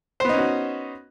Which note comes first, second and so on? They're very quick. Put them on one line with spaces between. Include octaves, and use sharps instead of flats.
C5 B3 D#4 C#4 F#4